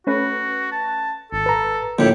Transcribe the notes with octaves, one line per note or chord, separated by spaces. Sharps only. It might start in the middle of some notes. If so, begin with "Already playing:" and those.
A3 C#4 F#4 B4
A5
G#1 A4
B4 A#5
F2 A2 D3 A#3 G4